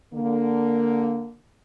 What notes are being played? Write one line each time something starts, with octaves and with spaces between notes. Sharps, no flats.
D3 A#3